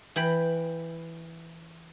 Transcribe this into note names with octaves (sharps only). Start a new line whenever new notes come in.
E3 G5 B5